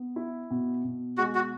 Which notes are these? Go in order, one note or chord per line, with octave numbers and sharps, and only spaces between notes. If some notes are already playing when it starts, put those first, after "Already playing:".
Already playing: B3
E4
B2
B2
G#3 F#4
F#4